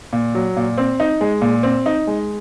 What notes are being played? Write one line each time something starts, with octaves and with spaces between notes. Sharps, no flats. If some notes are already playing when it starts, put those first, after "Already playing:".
A#2
F#3
A#2
C4
D#4
G#3
A#2
C4
D#4
G#3